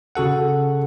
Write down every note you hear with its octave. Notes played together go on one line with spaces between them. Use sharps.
C#3 F#4 A4 F#5